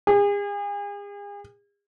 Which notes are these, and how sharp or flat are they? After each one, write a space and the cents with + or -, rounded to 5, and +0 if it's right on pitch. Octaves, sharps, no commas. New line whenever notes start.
G#4 -40